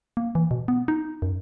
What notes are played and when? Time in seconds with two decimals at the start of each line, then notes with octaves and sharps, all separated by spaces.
0.17 A#3
0.35 E3
0.51 B2
0.68 B3
0.88 D#4
1.22 F#2